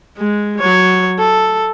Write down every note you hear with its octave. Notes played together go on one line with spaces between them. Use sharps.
G#3
F#3 C#5
A4